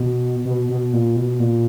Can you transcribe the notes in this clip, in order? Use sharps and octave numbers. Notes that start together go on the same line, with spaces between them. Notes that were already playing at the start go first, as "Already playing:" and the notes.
Already playing: B2
B2
B2
A#2
B2
A#2